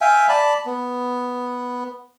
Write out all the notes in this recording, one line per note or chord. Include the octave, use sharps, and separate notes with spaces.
E5 F5 G5 G#5
D5 A5 B5
B3